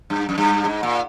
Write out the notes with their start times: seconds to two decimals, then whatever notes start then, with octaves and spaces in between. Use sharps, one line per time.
0.10 G2
0.29 F#2
0.38 G2
0.65 G#2
0.83 A#2